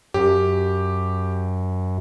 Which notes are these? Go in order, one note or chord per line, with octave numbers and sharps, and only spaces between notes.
F#2 G4